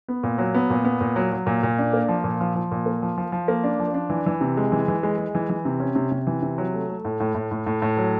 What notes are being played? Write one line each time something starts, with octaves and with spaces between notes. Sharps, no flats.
B3
A#2
F#3
B3
A#2
B3
A#2
F#3
F#3
A#2
A#2
D4
A#3
F3
A#2
F3
F3
A#2
A#3
F3
F3
F3
A#3
D4
F3
D4
E3
E3
C3
G#3
E3
E3
G#3
G#3
E3
E3
C3
C#4
C3
C3
E3
C3
F#3
A3
A3
A2
A2
A2
A2
A2
A2
F#3